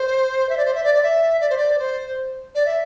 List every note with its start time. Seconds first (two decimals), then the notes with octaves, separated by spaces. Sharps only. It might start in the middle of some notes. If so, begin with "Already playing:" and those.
Already playing: C5
0.49 E5
0.57 D5
0.65 C5
0.75 E5
0.84 D5
0.95 D5
1.03 E5
1.41 D5
1.50 C5
1.57 D5
1.79 C5
2.55 D5
2.66 E5